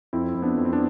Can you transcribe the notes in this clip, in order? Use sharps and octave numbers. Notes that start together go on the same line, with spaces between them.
F2 C4 E4
F2
B3 D4
F2
C4
B3 D4